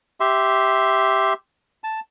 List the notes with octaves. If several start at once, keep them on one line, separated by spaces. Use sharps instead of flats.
G4 E5 C6
A5